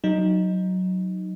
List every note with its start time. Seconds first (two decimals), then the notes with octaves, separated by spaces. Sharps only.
0.04 F#3 D#4